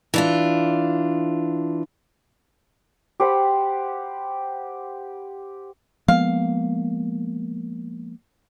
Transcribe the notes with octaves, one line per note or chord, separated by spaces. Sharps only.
E3 D4 F4
G4 C5 F#5 B5
F3 G#3 A#3 B3 F5